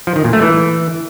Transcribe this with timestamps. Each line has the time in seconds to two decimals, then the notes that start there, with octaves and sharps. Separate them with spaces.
0.07 F3
0.16 D#3
0.25 A#2
0.33 A3
0.42 E3